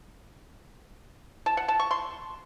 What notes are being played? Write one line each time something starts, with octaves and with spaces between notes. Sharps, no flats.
A5
F#5
A5
C#6
C6